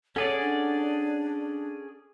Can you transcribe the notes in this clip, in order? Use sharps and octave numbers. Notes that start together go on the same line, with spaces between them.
C#4 G#4 A4 C#5 D5 F#5
D4